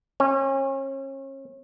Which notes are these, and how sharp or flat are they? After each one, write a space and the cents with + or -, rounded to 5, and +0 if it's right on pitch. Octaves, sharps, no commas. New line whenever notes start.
C#4 -35